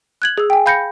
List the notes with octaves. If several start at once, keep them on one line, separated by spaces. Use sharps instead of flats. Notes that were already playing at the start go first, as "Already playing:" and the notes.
F#6 G#6 F#7
G#4 E6
G5 G#5
F5 B5 G6 A#6 C#7